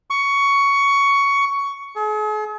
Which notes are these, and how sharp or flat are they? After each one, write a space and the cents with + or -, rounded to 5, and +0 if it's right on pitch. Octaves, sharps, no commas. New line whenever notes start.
C#6 +15
G#4 +45